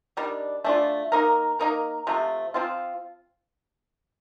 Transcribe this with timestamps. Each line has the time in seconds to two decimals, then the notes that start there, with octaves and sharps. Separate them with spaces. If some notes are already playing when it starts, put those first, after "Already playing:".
0.17 D#3 G3 D4
0.64 A3 D4 F4
1.12 A#3 D#4 A#4
1.59 A#3 D#4 A#4
2.07 C3 F3 A3
2.54 F3 C4 F4